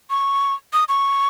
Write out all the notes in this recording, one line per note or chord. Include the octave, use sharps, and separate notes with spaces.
C#6
D#6
C#6